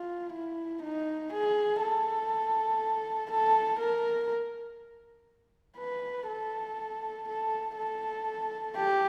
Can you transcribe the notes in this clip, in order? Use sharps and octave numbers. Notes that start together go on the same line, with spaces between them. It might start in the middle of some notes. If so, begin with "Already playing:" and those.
Already playing: F4
E4
D#4
G#4
A4
A4
A#4
B4
A4
A4
A4
G4